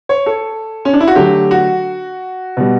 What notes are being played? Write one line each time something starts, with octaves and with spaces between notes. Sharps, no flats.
C#5
A4
C#4
D4
E4
F#4
D3 F#3 A3 G4
F#4
B2 G3